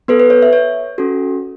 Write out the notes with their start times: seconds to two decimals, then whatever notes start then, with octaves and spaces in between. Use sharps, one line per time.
0.08 B3 A4 B4
0.20 B4
0.30 C#5
0.42 E5
0.53 C#5
0.98 C#4 F#4 A4